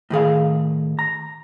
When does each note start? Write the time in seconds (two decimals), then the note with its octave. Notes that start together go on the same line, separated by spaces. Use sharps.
0.10 A2 D#3 G#4 F5
0.99 A#5